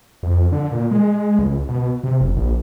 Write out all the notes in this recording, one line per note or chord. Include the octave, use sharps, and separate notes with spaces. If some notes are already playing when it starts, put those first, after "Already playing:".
F2
D3
A#2
G#3
C#2
B2
C3
F#1
A#1